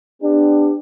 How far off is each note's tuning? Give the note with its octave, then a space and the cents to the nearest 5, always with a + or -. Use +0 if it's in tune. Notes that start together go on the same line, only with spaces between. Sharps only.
B3 +30 D4 +15 G4 +30